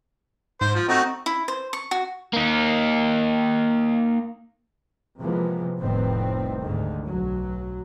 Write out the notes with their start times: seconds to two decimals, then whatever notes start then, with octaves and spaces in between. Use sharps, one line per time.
0.61 G#2 C5
0.75 F3
0.89 A3 C4 D#4 F#4
1.26 E4
1.48 C5
1.73 C#6
1.91 F#4
2.33 A#3 D#4
5.19 C3 E3 F3 G#3 A#3 B3
5.80 F1 C2 A2 D#3 B3 C4
6.61 D2 G#2 D3 D#3
7.05 B1 F#3